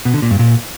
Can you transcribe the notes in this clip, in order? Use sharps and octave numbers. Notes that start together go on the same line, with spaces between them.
B2
D3
A#2
G2
A#2